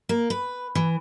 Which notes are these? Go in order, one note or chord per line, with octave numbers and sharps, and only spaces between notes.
A#3
B4
E3